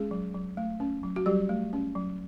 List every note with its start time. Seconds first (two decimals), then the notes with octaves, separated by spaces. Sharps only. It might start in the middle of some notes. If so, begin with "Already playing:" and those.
Already playing: G#3 C#4 G#4
0.11 F#3
0.34 F#3
0.57 A3
0.80 C#4
1.03 F#3
1.16 F#4
1.26 F#3 G3 G4
1.49 A3
1.73 C#4
1.95 F#3